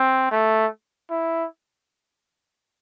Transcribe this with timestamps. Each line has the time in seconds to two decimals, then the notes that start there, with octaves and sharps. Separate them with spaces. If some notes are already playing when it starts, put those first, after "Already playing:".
Already playing: C4
0.31 A3
1.10 E4